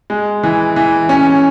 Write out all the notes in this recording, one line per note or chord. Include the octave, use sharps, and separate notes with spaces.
G#3
E3
E3
C#4